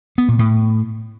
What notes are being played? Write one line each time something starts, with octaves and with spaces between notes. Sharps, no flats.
B3
A#2
A2